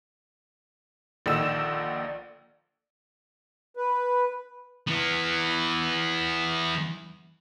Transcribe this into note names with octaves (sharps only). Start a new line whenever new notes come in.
A#1 D3 D#3 E6 E7
B4
E3 B3